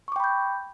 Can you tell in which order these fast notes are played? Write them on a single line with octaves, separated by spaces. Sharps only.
C#6 D6 G5 B5 G6